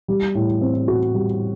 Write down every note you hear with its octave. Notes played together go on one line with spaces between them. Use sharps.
G3
A2
C4
F#4
G3